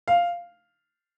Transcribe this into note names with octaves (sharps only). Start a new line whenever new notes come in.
F5